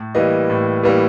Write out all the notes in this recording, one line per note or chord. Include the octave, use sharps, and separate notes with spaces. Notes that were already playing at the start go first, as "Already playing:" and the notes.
Already playing: A2
E3 G3 A#3 D#5
A2
E3 G3 A#3